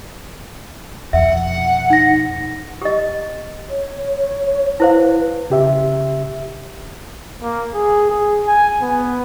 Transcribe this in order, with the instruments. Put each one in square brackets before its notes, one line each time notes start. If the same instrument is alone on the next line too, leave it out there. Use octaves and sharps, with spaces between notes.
[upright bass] F2 B2 [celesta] E5 [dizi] F#5
[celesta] D#4 A#6
[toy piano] G4 D#5
[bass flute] C#5
[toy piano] E4 C5 F5 [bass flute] B4
[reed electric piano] C#3 G4 E5
[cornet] A#3
G#4
G#4
G#5
B3